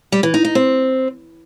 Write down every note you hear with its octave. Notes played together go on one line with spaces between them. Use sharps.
G3
E3
D#4
D#4
C4